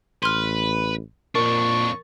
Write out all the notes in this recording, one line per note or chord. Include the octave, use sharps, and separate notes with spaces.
A1 B4 C6 F6
F2 A#2 D4 A#4 C#6